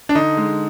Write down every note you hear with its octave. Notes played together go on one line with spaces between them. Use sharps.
D4
D3 D#4
G#3